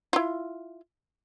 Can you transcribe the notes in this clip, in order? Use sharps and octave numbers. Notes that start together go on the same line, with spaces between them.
E4 F4